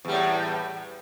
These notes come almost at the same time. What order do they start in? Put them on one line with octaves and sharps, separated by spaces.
E2 G3 A2